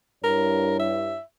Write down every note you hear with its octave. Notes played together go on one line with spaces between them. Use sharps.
G2 E4 A#4 C#5
E5